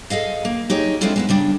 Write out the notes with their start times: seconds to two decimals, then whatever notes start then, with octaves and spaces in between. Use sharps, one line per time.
0.10 G#4 A4 D#5 F5
0.45 A#3
0.70 D#4 G4 G#4 C#5
1.01 G#3 C4 D4 E4 F4 A4
1.16 G#3 B3 E4
1.29 C#3 G3 D4